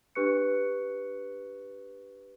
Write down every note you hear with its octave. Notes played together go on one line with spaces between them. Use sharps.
D4 G4 B4 C#6 F#6 C#7